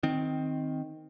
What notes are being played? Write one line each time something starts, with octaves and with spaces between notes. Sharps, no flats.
D#3 C4